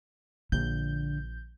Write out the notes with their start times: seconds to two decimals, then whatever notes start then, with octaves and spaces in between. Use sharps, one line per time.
0.52 A#1 D3 G6